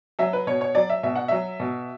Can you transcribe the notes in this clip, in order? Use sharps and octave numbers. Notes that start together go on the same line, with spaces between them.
F#3 E5
B4
B2 C#5
C#5
F#3 D5
E5
B2 E5
F#5
F#3 E5
B2